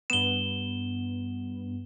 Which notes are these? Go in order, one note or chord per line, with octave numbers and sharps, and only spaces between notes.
G2 B3 E7 G7